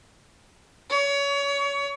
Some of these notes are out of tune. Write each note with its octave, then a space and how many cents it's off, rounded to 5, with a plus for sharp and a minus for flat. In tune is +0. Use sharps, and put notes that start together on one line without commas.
C#5 +25